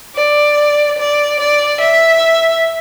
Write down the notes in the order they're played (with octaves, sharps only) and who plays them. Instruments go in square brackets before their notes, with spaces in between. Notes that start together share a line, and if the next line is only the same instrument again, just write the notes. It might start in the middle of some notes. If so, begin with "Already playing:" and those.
[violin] D5
D5
D5
E5